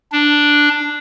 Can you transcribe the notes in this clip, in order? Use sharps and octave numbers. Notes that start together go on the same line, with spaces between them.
D4